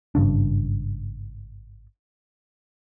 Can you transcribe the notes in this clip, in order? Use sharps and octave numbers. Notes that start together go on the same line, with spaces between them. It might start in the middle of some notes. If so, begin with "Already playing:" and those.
G#1 G2 C#3 D4